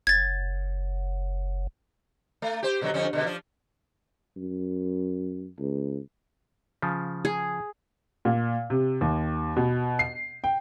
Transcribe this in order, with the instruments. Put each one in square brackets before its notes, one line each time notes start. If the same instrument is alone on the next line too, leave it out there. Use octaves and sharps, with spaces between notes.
[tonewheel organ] F#1 [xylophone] G#6 A6
[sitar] A3
G4 C5
B2 D3 F#3
F2 D3 C#4
B2 D3 G#3
F3 D4
[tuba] F#2
C#2
[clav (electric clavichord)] C#3 F3
[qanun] G#4
[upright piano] A#2
C3
D#2
B2
C7
G5